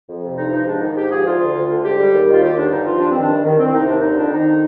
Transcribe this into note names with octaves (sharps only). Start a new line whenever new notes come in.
F2
C3
G2 D#4
F3 D#4
G#2 D4
D#3 D#4
G#2 G4
F3 G#4
D2 F4
D3
D2
D3
G#2 G4
G3
D#2
D#3
F4
D#2 G4
D3 D4
G2 D#4
F3 F4
G2 D4
D#3 C4
D4
G2
D#3
C2 C4
C3 D#4
D#2 D4
D3 D#4
F2 D4
D#3 D#4